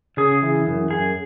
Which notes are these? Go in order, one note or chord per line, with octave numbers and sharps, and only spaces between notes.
C#3 G#4
E3
F#2
F#2 G#4